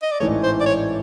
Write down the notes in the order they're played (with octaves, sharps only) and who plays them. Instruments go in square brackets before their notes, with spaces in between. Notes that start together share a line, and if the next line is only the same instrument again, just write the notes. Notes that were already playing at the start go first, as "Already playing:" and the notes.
[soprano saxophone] D#5
D5
[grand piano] A1 G#2 E3 A3 [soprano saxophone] C#5
[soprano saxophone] C5
D5
C#5